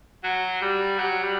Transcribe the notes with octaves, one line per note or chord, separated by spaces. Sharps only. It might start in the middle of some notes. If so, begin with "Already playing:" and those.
F#3
G3
F#3
G3